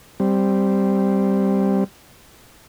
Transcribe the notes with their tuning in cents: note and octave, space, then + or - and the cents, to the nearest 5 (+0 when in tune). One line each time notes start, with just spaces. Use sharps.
G3 +0 C4 +0